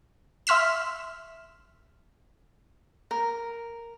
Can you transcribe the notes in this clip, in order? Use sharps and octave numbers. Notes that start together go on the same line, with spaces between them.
E5 C6 F6 B6 E7
A#4